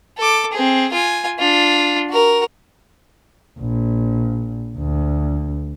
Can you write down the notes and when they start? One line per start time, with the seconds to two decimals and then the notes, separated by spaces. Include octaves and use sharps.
0.18 A4 D6
0.53 C4 G#4
0.92 F4 G#5
1.39 D4 F4
2.10 F#4 A#4
3.59 A#1
4.78 D2